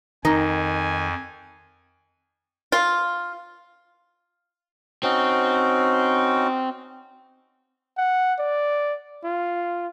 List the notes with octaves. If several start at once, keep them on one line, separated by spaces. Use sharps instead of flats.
F2 D#3 D#4 G#5
F4
C4 C#4 D#4 F#4
F#5
D5
F4